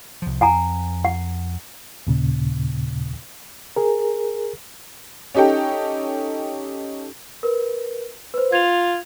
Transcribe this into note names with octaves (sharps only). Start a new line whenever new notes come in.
C2 F3
F2 F#5 G#5 A#5
F#5
D#2 A#2 C#3
G#4 A#4
C#4 D#4 G4 A4 G5
A#4 B4
B4 C5
F4 G#6 F7